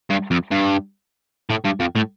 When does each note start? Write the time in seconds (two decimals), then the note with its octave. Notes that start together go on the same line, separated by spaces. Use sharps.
0.10 G2
0.31 F2
0.51 G2
1.50 A2
1.65 G2
1.80 F2
1.96 A2